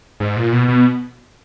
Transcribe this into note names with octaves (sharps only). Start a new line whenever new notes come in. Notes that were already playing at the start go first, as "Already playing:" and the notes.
G#2
A#2
B2
B2